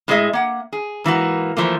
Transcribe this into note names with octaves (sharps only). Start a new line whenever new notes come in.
A2 F#3 G#3 G#4 D#5 E5
A#3 F#5
G#4
G#2 E3 A#3 F#4
E3 F3 A3 A#3